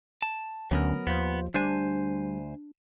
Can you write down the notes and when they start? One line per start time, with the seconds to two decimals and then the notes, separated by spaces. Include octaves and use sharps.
0.22 A5
0.71 D2 D3 F#3 A3 B3 C#4 A#4
1.07 D#2 F3 B3 F4 C5
1.54 D2 G3 D4 C5 G#5